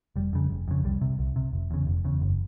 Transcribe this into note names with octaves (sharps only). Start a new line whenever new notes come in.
F1 G3
F2 C#3
F1
F2 C#3
C2 G3
C3
C2
C3
F1
E2 C#3
F1
E2 C#3
F#1